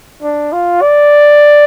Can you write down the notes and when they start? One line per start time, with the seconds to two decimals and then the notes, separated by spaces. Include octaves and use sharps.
0.23 D4
0.52 F4
0.81 D5